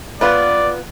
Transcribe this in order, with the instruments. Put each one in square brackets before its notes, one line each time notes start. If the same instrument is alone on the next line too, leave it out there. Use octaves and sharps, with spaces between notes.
[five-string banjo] B3 F4 B4 [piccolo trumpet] D5